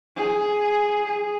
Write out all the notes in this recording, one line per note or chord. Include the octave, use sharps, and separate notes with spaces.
G#4
G#4